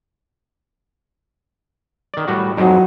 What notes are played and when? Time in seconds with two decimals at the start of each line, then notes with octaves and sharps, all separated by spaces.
2.14 D#3 D5
2.28 A2 G3 F#4
2.57 F2 G#2 F#3 D#4